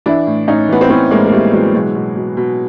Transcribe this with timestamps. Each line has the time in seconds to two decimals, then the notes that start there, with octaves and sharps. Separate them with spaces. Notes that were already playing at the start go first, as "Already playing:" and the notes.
0.06 E3 D4 E4
0.27 A2
0.48 A2 C#4 D#4
0.69 E3 B3
0.81 C4
0.90 E3 B3 C#4
1.11 A2 G#3 A#3
1.27 A#3
1.32 A2 G3 A3
1.53 E3 F#3 G#3
1.74 B2 F#3 G#3
1.95 B2
2.16 B2
2.37 B2